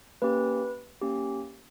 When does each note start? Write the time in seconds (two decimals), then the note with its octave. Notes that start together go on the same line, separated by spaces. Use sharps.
0.22 A#3 C#4 G4 B4
1.02 A#3 C#4 G4